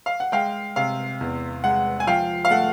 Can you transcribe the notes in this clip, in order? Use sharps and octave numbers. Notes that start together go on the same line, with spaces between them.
F5
F#5
G#3 F5 G5
C3 F5
E2
G#3 F#5
G#5
F3 F5 G5
F5
A3 F#5